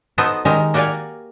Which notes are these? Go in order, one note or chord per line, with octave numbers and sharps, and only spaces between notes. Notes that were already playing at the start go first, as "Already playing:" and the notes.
B3 D#4 F#4 A4 B4 C5
D#3 G#3 G4 A#4
A#3 F#4 G4 D5 F5 G#5